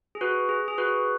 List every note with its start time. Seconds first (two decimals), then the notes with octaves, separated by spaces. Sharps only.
0.15 G#4
0.21 F#4 B4
0.49 G#4
0.68 G#4
0.78 F#4 B4